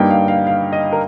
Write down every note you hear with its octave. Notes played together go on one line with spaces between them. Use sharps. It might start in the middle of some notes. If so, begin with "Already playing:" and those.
Already playing: G2 G3 A#3 D#4 G5
F5
F5
F5
D#5
A#4